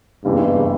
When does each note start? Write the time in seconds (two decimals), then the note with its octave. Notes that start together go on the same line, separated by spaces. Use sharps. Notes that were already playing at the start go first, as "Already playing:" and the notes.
0.24 F#1 E2 G2 C#3 E3